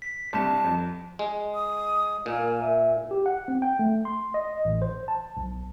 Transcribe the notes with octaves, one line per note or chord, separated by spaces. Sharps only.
B6
C2 G2 A5 E7
F2
G#3
D#6
A#2 A#3 G#5
E5
G4
F#5
C4
G5
A3
C6
D#5
A1
C5
A5
B1